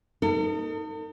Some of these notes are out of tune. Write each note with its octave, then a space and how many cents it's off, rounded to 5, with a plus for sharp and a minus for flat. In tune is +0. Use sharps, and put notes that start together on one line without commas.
D#4 +0 A4 +45